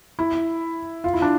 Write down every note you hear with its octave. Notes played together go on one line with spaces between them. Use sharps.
E4
F4
E4
D4